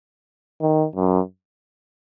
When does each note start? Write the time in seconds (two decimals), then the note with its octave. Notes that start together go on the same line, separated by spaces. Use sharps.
0.61 D#3
0.95 F#2